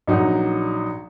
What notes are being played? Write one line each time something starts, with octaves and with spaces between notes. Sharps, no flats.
A#1 F#3 D#4 F#4